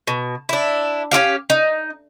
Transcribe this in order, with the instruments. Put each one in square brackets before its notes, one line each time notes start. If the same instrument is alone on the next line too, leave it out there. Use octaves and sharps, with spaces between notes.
[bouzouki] B2
D4 E4
C#4 F4 G4 F5
D#4